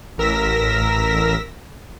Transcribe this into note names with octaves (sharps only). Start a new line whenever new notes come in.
A1 A#4 E6 A#6 B6